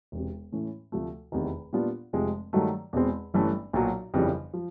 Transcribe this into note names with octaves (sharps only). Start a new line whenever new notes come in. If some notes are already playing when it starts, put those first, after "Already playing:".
E1 E2 C3
A2 E3 A3 C#4
D2 C3 F3 A3
F1 E2 C3 D#3
A#2 G3 B3 D4 F4
F1 F2 C3 F3 G#3
G2 D#3 F#3 A3
E2 B2 G#3 C4
G1 G2 E3 A3 C#4
B1 A#2 F#3
G1 F2 C#3 E3 G3
F3